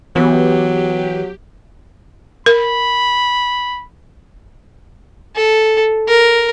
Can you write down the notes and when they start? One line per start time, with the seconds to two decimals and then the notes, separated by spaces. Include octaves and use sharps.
0.16 E3 F#3 B3 G4
2.46 A#4 B5
5.35 A4
6.08 A#4